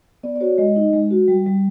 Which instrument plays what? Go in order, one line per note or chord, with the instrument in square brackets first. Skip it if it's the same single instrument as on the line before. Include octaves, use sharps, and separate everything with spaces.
[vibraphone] B3 D5
D5
F#4 C#5
G#3 D#5
D#4
G#3
F#4
G3
G3